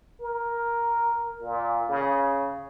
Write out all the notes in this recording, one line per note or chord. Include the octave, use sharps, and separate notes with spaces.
A#4
A#2
C#3